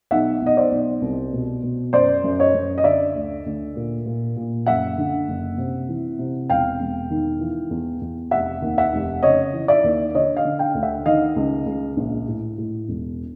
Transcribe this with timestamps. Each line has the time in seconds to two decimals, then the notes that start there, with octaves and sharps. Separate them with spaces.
0.11 B1 E5 F#5
0.42 B1 D#5
0.57 C5 D5
0.72 B1
1.02 C2
1.33 B2
1.63 B2
1.93 F#2 C5 D5
2.24 F#2
2.40 C#5 D#5
2.54 F#2
2.78 D#5
2.84 D3 D5 E5
3.15 D2
3.46 D2
3.76 A#2
4.06 A#2
4.36 A#2
4.66 F#1 E5 F#5
4.98 D3
5.28 F#1
5.58 C3
5.89 E3
6.19 C3
6.50 E1 F5 G5
6.80 E1
7.10 D#3
7.40 E3
7.70 E2
8.01 E2
8.31 F1 E5 F#5
8.62 D#2
8.78 E5 F#5
8.93 F1
9.23 C#3 C#5 D#5
9.53 E3
9.68 D5 E5
9.84 D#2
10.14 D3 C#5 D#5
10.37 D#5 F5
10.45 D3
10.59 F5 G5
10.75 D2
10.83 E5 F#5
11.06 D#3 D#5 F5
11.36 C#2
11.66 C#2
11.97 A#1
12.28 A2
12.58 A2
12.88 E1